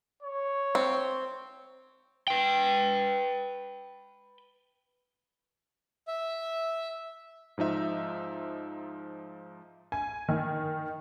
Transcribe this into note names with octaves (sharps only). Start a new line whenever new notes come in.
C#5
C4
B4 G5
E5
G#2 F3 D#4 E5
G#5
D#3